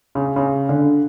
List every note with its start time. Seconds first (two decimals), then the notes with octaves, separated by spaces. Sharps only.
0.15 C#3
0.36 C#3
0.69 D3